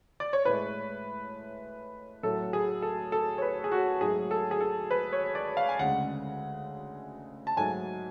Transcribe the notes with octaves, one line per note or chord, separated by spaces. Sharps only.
D5
C#5
A2 G#3 B4
A2 F#3 A3 A4
G#4
A4
A4
C#5
B4
G#4
F#4
G#2 F#3 A3 G#4
A4
G#4
A4
B4
C#5
D5
F5
G#5
D2 C#3 G#3 F#5
A5
G#2 F#3 A3 G#5